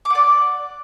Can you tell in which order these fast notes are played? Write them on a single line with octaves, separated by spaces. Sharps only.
D6 F#5 D5